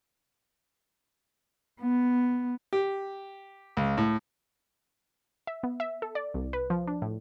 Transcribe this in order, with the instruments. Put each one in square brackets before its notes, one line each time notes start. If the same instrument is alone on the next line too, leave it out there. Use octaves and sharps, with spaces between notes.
[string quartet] B3
[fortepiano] G4
C#2
A2
[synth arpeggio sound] E5
B3
E5
A4
D5
C2
B4
F3
D4
A2